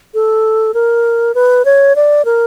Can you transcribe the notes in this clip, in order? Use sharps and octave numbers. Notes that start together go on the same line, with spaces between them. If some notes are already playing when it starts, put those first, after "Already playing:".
A4
A#4
B4
C#5
D5
A#4